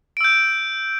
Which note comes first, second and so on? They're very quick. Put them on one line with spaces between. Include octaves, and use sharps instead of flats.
D7 E6 G6